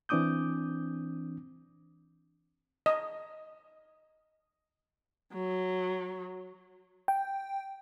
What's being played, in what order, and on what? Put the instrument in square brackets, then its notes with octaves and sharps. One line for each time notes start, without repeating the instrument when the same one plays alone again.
[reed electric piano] E3 C4 D4 D6 D#6 G6
[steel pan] D#5
[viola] F#3
[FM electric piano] G5